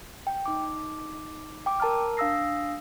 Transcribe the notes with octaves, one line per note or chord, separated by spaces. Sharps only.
G5
D#4 D6
G5 D6
A#4 A5 A#5 F6
D4 F5 D#6 E6 A#6 C7